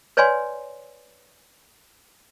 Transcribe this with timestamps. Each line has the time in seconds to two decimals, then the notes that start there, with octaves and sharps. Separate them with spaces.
0.17 B4 C#5 D5 F5 G#5 C6